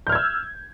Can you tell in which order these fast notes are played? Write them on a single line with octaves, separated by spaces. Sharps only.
G6 F6 G#6 E6